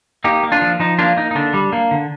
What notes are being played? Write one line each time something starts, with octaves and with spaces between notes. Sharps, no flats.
A#3 D#4 G4
A#3
D4 F4
F3
F3 D#4
A#3 D4 F4
A#3 D#4
D#4
D3 D4
G3
A#3
D3